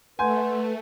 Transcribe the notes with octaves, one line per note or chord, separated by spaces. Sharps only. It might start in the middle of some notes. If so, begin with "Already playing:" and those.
A3 B4 F#5 G#5 C6 G6